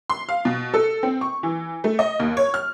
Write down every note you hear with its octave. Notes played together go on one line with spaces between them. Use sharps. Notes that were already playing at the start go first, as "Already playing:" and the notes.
C6
F5
B2
A4
C4
C#6
E3
A3
D#5
D#2
C#5
F6